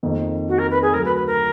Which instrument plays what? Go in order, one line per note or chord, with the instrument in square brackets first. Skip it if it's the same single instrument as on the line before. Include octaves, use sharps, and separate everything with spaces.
[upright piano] F2 D#3 A#3
[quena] F#4
A#4
B4
G#4
[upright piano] D2 D3 F#3 [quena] A#4
[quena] B4
B4
A#4